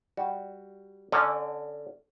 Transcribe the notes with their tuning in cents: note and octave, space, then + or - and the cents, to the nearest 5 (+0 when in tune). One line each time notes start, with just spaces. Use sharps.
G3 +0 F#4 +0
D3 +0 C#4 +0 D5 +45